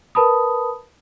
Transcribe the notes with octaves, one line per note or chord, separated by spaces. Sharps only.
A#4 B4 A5 B5 D#6